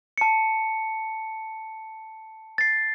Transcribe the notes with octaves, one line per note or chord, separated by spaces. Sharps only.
A5 C#7
A6 C7